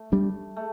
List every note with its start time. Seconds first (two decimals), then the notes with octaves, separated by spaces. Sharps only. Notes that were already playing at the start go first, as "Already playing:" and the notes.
Already playing: A3
0.12 G3 D4
0.56 A3